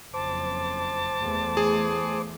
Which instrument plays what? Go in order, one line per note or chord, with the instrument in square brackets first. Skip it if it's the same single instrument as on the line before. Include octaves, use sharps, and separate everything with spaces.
[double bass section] F#1 F2 [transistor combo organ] C5 D6 [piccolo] A5
[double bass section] E2 A3
[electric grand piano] G#4